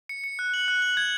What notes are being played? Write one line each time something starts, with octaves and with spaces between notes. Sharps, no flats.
C#7
C#7
F#6
F#7
F#6
F#7
G#6